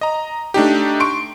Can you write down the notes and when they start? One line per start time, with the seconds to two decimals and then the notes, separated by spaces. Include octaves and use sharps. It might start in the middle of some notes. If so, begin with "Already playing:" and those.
0.01 D#5 A#5
0.54 A3 D4 D#4 G4
1.00 C6 C#6 D7